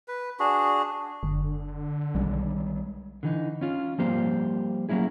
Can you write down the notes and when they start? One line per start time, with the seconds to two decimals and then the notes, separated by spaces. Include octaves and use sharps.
0.08 B4
0.40 D4 F#4 G#4
1.23 F#1 D3
2.15 B1 D#3 G3 G#3
3.23 D3 E3 D#4
3.61 C#4 F4
3.98 F3 G3 A#3 C4 G4 C5
4.89 F#3 A#3 C#4 E4 G#4